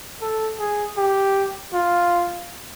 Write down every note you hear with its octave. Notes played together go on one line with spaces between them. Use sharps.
A4
G#4
G4
F4